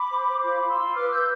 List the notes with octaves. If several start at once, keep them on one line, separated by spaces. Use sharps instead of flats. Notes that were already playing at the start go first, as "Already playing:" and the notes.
Already playing: B5 D6
C5
C5
F4 B5 D6
F4
C6 E6
F4
B4 D6 F6
B4 E6 G6